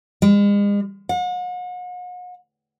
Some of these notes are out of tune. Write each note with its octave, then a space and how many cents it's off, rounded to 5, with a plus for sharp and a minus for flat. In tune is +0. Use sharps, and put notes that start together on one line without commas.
G#3 -40
F#5 -40